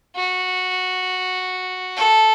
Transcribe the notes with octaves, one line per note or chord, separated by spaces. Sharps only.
F#4
A4